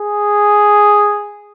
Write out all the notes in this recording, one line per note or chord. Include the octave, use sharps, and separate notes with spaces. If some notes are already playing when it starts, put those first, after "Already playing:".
Already playing: G#4